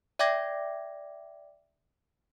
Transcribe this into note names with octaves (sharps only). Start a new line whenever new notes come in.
D5 E5 G5 D6 G#6 A#6